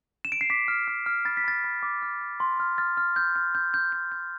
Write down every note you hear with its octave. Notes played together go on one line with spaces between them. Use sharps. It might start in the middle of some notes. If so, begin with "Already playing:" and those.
E7
D7
C7
D6 B6
F6
F6
F6
B5 A6
B6
B5 A6
B5
D6
F6
F6
C6
F6
F6 A6
F6
F6 G6
F6
G6
G6
G6
G6